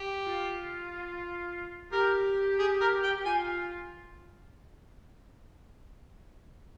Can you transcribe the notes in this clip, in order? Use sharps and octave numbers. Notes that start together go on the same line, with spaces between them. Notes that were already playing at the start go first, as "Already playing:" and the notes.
Already playing: G4
F4
G4 A#4
G#4
A#4
G5
G4
F4 G#5